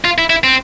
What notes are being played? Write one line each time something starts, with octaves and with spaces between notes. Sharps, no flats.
F4
E4
E4
C4